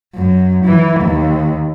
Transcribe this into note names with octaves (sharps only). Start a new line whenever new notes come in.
F#2
E3
D#2